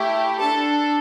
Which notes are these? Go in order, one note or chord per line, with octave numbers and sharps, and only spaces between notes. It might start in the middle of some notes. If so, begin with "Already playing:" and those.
Already playing: A3 E4 G4
D4 A4 A5